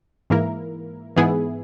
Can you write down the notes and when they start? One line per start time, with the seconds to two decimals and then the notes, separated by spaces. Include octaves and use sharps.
0.30 G#2 E3 A#3 E4 A#4
1.16 G#2 E3 B3 E4 G#4